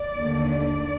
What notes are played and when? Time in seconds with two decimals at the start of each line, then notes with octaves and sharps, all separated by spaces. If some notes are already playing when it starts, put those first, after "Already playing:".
Already playing: D5
0.17 D#2 D3 A3
0.51 D5